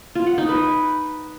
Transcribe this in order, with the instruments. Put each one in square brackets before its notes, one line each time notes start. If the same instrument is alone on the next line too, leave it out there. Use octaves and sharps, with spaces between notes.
[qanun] F4
F#5
D#4
B4